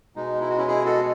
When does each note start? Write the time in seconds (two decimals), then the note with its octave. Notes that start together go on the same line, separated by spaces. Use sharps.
0.16 B2 G#3 D#4
0.41 E4
0.49 F#4
0.57 C#4 E4
0.68 E4 G#4
0.85 F#4 A4